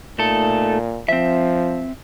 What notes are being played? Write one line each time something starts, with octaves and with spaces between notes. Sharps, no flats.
A#2 A3 D#4 A4
F3 C4 E5